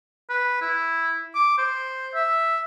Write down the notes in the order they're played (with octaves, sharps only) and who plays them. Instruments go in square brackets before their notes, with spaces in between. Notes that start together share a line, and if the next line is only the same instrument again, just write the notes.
[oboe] B4
E4
D6
C5
E5